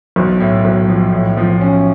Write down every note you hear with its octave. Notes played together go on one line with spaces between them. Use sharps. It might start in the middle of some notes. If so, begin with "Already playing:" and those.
B1
A2
B1
F3
A2
F3
C#4